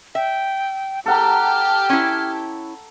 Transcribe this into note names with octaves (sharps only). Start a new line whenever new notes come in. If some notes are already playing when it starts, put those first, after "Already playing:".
E5 G5
G4 A4 F#5 G5 A5 A#5 F6
C#4 E4